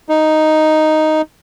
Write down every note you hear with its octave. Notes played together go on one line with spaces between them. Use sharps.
D#4